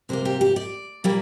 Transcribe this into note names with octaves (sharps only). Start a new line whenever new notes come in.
C3 G3 A#3 C5
G4
G4
D5
A#2 G3 A#3